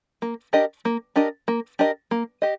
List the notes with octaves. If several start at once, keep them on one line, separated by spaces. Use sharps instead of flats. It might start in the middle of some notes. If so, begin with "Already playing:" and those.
A#3
D4 G4 A#4 D#5
A#3
D4 G4 A#4 D#5
A#3
D4 G4 A#4 D#5
A#3
G4 D#5